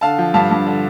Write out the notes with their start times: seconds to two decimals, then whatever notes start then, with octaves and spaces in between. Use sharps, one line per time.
0.01 D3 F5 A5
0.18 F3
0.34 G2 F5 A5
0.51 G2
0.67 D3